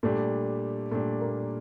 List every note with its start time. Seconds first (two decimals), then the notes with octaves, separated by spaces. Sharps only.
0.03 A#2 G3 A3 D4
0.91 A#2 G3 A3 D4
1.21 A#3